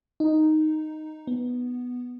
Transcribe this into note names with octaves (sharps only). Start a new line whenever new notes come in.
D#4
B3